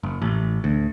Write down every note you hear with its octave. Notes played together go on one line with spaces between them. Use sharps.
F#1
A1
D2